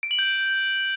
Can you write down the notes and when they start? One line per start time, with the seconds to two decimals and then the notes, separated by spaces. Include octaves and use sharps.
0.03 D7
0.11 F#7
0.19 G6